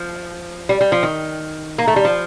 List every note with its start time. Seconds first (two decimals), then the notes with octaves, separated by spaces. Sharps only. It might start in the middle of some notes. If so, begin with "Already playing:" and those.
Already playing: F3
0.69 G3
0.81 G3
0.92 F3
1.03 D#3
1.78 A#3
1.88 A3
1.96 G3
2.05 F3